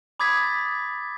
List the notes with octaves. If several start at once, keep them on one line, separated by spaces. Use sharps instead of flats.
B5 D6 D#6 G#6 A6 B6